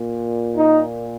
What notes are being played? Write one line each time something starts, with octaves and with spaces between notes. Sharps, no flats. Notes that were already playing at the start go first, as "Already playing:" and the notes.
Already playing: A#2
D#4